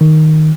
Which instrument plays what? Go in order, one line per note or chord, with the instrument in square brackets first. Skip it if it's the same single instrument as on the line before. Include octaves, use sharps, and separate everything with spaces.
[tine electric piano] D#3